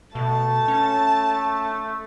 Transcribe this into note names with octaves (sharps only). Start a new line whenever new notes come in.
B2 A3 A5
C#4